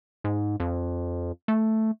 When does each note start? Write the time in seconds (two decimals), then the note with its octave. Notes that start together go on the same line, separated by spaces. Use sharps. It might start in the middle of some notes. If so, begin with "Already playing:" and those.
0.24 G#2
0.60 F2
1.48 A3